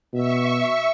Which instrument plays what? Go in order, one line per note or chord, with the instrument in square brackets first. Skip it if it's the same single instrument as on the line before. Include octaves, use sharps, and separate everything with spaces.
[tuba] B2 [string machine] E5 C#6